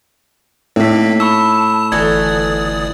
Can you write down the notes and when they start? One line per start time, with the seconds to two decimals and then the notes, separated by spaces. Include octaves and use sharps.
0.76 A2 A#3 C4 D#4 B6
1.20 A5 B5 C#6 E6
1.92 G1 E3 F#4 A4 D5 D#6 G#6